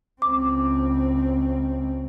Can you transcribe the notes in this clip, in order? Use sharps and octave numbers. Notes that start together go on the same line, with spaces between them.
C#2 C4 D6